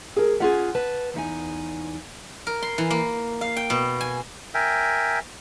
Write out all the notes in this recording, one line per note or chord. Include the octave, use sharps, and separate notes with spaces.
G#4 A#4
C#4 F4 G#4 F#5
B4 A5
E2 D#4 G#5
A#4
C6
E3
A#3
F5
G5
B2
G#5
A#4 E5 G5 G#5